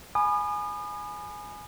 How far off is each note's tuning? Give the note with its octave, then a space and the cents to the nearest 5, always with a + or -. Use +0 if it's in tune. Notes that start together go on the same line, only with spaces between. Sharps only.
G#5 +5 B5 +0 D#6 -40